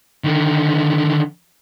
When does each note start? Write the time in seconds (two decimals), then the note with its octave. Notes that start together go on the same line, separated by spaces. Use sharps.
0.24 D3 D#3